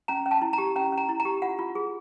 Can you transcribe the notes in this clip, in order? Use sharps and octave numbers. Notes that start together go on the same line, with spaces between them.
C#4 A#5
C#4
A5
E4
A#5
G4
C#4 A#5
C#4
A#5
E4
A#5
G4
F4 F#5
F4
G#4